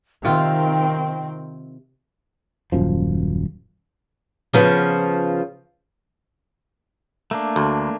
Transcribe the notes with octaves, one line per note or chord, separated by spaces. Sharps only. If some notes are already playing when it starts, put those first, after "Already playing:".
C3 D#3 C4 F4 G5
D#1 F#2 F3
C#3 F3 B3
A3 A#3 D4
D2